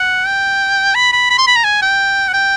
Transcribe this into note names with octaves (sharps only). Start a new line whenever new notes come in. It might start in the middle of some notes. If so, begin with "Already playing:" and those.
Already playing: F#5
G5
B5
B5
B5
C6
B5
A#5
G#5
G5
F#5
G5